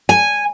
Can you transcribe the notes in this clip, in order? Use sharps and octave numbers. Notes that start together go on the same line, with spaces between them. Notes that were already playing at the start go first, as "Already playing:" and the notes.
G#5